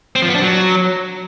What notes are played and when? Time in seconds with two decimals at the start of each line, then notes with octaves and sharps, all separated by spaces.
0.16 C4
0.22 F3
0.29 B3
0.35 D4
0.42 F#3